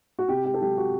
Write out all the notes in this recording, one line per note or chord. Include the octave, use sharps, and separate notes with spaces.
F#4
C3 G4
G4
A4
F#3 G4
F#4